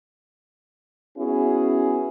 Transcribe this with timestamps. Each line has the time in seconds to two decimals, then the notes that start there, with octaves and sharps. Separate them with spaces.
1.17 B3 C#4 E4 F#4 G#4